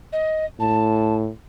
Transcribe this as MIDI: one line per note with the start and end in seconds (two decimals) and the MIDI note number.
0.12 0.45 75
0.60 1.29 45
0.60 1.16 81